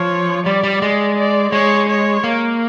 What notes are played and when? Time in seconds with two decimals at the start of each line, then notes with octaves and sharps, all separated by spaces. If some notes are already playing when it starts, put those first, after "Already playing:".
Already playing: F3 C#5
0.46 G3 D5
0.63 G3
0.82 G#3
1.17 D5
1.52 G#3 C#5
1.89 C#5
2.24 A#3